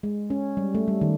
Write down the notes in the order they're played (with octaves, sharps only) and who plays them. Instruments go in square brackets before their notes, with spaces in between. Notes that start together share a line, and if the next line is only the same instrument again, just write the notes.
[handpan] G#3
C#4
G3
A3
G3
D#3